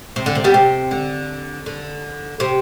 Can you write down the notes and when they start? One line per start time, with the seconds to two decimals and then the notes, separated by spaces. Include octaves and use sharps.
0.16 C3
0.26 D3
0.35 C3
0.44 G3 B3
0.54 C3
0.91 D3
1.66 D3
2.40 C3